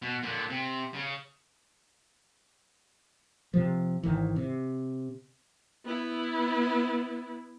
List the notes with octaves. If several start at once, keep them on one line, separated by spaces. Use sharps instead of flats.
B2
A#2 D3
C3
C#3
C3 F3
G#1 D#3 E3
C3
B3 E4